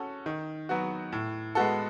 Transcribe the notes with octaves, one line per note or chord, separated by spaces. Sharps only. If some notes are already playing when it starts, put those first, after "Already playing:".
Already playing: C#4 F#4 A4
D#3
F#3 B3 F#4
A2
G#3 B3 F#4 A4